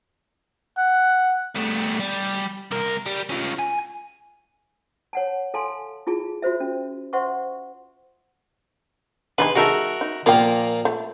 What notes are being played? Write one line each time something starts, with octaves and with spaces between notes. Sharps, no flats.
F#5
G3 A3
G3
C2 A#4
G3
C#4 F4
G#5
C#5 F#5 A5
A4 F5 G#5 A5 C6
E4 F4 G#4 A5
F4 F#4 C5 E5
C#4
C5 E5 F#5 C6 C#6
D4 D#4 G#4 B4 C6
G#3 D#4 F#4 A4 A#4 E5
D#4
A#2 F3 A#3 A#4 G5
A3